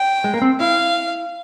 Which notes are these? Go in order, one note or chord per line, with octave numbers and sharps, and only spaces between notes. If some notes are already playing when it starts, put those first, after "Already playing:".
Already playing: G5
G#3
A#3
C4
E4 F5